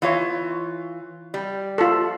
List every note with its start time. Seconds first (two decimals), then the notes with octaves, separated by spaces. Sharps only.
0.02 E3 F4 C#5
1.34 G3
1.78 F4 A4